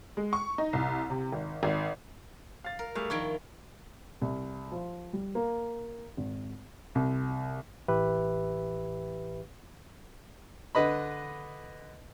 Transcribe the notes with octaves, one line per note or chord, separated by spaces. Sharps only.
G#3
C#6
D#4
C2
C3
G#1
G#1
F5 A6
A#4
G3 A3 G#4 F5
D#3 F3 E4 C#6 G#6 D7
C2
F3
G3
A#3
G#1
C2
A1 A2 E3 G4 B4 E5
D3 B4 D#5 B5